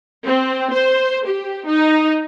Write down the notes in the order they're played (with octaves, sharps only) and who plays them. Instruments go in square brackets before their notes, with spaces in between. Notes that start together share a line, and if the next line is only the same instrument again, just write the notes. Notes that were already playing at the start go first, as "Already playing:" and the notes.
[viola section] C4
C5
G4
D#4